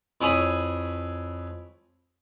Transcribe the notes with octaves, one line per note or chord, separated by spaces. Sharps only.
F2 E4 G#4 C#5 G#5 B5